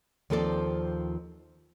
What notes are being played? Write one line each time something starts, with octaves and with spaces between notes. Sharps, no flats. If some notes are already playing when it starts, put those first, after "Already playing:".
D#2 F3 C4 A4 A#4 D5